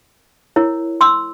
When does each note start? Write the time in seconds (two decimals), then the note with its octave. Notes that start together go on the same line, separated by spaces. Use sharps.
0.56 E4 A#4 C#5
1.01 C6 E6